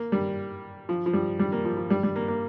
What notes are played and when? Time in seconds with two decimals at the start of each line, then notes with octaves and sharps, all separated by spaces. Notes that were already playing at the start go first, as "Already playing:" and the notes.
Already playing: A#3
0.12 G3
0.89 F3
1.06 F3
1.13 G3
1.39 G3
1.52 A#3
1.65 F3
1.77 F3
1.90 G3
2.03 G3
2.16 A#3
2.28 A#3